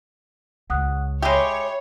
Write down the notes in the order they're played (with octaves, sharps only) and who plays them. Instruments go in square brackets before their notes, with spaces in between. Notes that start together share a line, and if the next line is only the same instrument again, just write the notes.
[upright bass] C#2 [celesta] F#5 D#6 F#6
[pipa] G#3 G4 [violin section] C#5 [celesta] E5 B5 C7